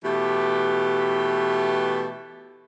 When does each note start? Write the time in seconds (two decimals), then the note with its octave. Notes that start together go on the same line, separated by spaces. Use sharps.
0.04 B2 E3 A3 G4